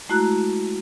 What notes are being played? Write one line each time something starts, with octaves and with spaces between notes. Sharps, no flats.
G#3 A3 E4 F#4 A#5 F#6